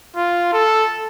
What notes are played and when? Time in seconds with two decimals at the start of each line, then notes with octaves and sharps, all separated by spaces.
0.16 F4
0.53 A4